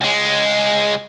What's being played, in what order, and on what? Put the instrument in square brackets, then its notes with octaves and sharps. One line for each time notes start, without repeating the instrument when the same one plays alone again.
[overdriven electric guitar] C#2 G#3